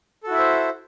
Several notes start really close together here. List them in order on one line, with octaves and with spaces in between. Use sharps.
A4 F#4 E4 E5 C5